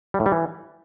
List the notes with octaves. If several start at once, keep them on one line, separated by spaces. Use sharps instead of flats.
G3
A2
G3
E3